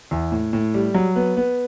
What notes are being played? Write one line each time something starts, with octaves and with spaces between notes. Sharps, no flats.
E2
A2
A2
G3
F#3
B3
B3